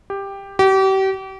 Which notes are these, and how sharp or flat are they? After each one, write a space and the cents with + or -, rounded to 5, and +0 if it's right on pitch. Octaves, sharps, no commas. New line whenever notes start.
G4 +10
G4 -35